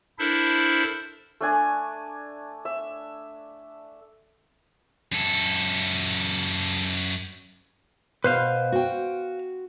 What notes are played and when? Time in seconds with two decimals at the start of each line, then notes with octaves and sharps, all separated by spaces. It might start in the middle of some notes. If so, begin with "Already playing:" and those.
0.19 D4 E4 A4 A#4 C5 E5
1.41 A3 D4 G#5
2.65 E5
5.12 F#2 A4
8.24 B2 B4 C5 F5
8.72 F#4 G5